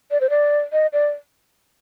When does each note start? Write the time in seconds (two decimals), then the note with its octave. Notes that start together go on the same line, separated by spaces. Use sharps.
0.11 D5
0.21 C5
0.30 D5
0.72 D#5
0.93 D5